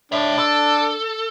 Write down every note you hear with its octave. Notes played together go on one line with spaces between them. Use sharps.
D4 C#5 E5
A4